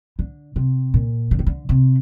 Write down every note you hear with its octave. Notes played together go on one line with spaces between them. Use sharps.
D3
C3
A#2
D3
D#3
D3
C3